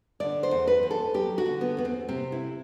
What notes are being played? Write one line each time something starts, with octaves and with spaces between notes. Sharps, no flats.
D3 D5
C5
E2
B4
E2
A4
F#3 G4
F#4
D3
B3
E2 B3
C4
C3 C4
E4